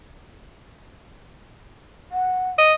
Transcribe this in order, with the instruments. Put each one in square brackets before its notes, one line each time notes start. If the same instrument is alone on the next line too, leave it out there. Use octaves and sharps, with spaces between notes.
[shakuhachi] F#5
[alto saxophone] D#5